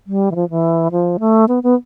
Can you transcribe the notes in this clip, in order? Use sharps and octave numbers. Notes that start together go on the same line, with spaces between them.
G3
E3
F3
E3
F3
A3
B3
B3